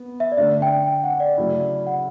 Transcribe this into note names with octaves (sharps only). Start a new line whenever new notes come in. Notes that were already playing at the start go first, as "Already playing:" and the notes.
Already playing: B3
E5
D5
D3 A3 D4 E5
G5
G5
F#5
D5
C#3 F#3 A3 E4
F#5